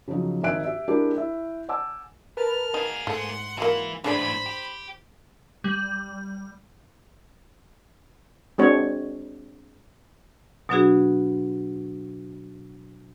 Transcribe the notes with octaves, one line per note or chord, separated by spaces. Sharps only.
C#3 F3 F#3 D#4
G#1 D#4 E5 G#5 F#6 D7
G4 E5
G#3 D4 E4 G4 A#4
E4 E5
F#5 G#5 A5 D6 E6
A#4 B4 A5 F6
A#3 D#4 G#4
G#2 A3 F#5 C6
E3 F#3 A#3
E2 A2 D4 G#4 C5 D5 B5
G4
G3
G#3 C4 D4 F#4 C#5
B2 F#3 B3 D4 F#4 G#4